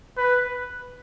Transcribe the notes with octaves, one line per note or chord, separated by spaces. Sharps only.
B4